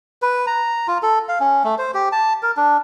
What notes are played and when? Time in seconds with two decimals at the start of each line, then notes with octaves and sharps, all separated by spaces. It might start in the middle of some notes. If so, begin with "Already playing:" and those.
0.22 B4
0.47 A#5
0.88 F4
1.03 A4
1.29 F5
1.40 C#4
1.64 A3
1.78 C5
1.94 G4
2.12 A5
2.43 A#4
2.57 D4